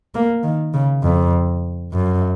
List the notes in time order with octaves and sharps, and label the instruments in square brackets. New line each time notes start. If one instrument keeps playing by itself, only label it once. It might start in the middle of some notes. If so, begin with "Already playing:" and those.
[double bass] A#3
D#3
C#3
F2
F#2